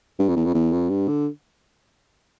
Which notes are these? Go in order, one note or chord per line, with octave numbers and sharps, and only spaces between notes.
G2
F2
E2
F2
E2
F2
G2
D3